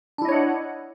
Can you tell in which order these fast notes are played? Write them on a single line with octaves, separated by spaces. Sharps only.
D4 E4 D#5 C#5 F#5